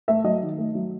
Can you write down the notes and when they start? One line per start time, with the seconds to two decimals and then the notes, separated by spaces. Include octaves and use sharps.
0.08 A3 E5
0.24 F#3 D#5
0.42 D#3
0.58 A3
0.75 F#3